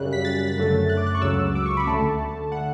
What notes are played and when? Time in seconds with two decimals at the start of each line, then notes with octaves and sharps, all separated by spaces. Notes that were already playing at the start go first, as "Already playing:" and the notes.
Already playing: F#2 C#3 G3 F#6
0.13 B6
0.25 A6
0.57 F#2 D3 F#3 A3
0.89 F#6
0.97 D6
1.07 F#6
1.15 C#6
1.22 C#2 C#3 F#3 E6
1.55 D6
1.66 C#6
1.77 B5
1.87 D2 D3 A3 A5
2.52 D3 A3 F#5